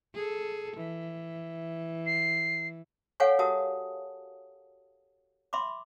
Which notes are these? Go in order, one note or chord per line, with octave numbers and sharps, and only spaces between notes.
G#4 A4
E3
C7
A4 C#5 F5 F#5 G#5 C#6
F#4 G4 A#4 E5 A5 D#6
E5 B5 C6 D6